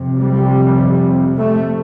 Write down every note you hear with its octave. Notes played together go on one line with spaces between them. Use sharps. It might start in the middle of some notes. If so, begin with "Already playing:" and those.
Already playing: F2 C3
G3
A3